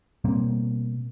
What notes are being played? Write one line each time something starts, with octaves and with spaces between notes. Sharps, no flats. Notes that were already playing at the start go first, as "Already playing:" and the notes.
B2 G3 A#3 C4